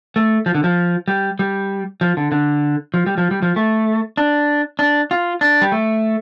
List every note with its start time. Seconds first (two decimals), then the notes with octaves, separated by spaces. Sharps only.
0.16 A3
0.46 F3
0.55 D3
0.64 F3
1.08 G3
1.39 G3
2.01 F3
2.17 D3
2.32 D3
2.94 F3
3.06 G3
3.18 F3
3.31 G3
3.42 F3
3.56 A3
4.17 D4
4.79 D4
5.11 F4
5.41 D4
5.62 G3
5.72 A3